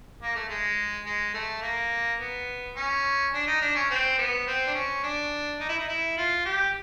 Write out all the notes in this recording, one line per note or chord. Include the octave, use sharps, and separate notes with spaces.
A#3
A3
G#3
G#3
A3
A#3
B3
C#4
D4
D#4
D4
C#4
C4
B3
C4
D4
C#4
D4
D#4
E4
D#4
E4
F4
G4